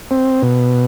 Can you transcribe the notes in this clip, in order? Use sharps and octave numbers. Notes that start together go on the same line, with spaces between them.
C4
B2